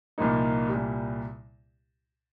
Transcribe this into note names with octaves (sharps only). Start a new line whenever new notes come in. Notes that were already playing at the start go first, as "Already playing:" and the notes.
C2 A#2 F3 A#3 D#4
C2 A#2 G3